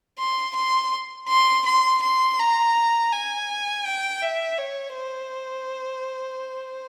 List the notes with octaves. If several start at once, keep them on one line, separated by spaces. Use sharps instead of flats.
C6
C6
C6
C6
C6
A#5
G#5
G5
E5
C#5
C5